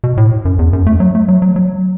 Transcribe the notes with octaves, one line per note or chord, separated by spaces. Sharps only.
B2
A2
F#2
E2
F#2
A3
F#3
A3
F#3
F#3
F#3